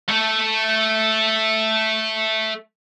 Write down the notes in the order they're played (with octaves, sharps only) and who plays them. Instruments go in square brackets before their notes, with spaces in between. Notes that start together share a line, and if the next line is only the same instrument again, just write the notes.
[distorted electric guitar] A3 A4